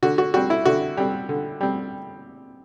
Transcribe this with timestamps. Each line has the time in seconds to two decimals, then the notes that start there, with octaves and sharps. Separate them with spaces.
0.03 D3 F#4
0.18 F#4
0.34 G3 C4 F#4
0.50 E4
0.65 D3 F#4
0.97 G3 C4
1.29 D3
1.61 G3 C4